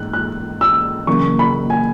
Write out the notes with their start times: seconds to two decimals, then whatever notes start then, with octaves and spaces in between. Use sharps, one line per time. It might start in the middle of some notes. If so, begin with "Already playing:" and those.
Already playing: G#2 F#6
0.13 F#6
0.61 E6
1.07 F#1 F#2 E3 A#3 C#6
1.39 B5
1.70 G#5